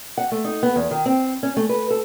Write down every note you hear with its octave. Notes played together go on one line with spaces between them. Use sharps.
F#5
A3
D#4
B3
E2
D#3
C4
C#4
A3
B4
A4